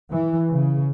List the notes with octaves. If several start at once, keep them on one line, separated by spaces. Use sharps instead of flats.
E3
C#3